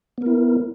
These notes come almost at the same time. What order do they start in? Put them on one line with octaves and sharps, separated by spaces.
B3 A#4 E4